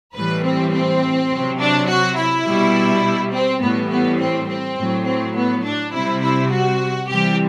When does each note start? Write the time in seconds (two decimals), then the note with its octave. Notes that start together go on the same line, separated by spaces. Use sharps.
0.14 A2 E3 G3 B4
0.43 C4
0.72 C4
1.30 C3 F#3
1.59 D4
1.88 F#4
2.17 E4
2.46 B2 G3
3.33 C4
3.61 A2 E3 G3 B3
3.90 B3
4.20 C4
4.48 C4
4.77 A2 F#3
5.06 C4
5.35 B3
5.64 D4
5.93 C3 G3 E4
6.22 E4
6.51 F#4
7.08 C3 E3 G3 G4